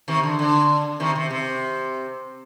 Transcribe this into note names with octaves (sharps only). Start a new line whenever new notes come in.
C3 D#3
D3
D3
C3 D#3
C3
C3